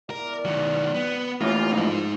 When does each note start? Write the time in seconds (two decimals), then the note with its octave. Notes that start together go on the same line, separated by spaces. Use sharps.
0.10 E2 A#4 D5
0.45 D#3 F#3
0.94 B3
1.41 A2 E3 A#3 C#4 F4 G4
1.73 F3 G#3 D#4